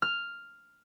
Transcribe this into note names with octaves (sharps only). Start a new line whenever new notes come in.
F6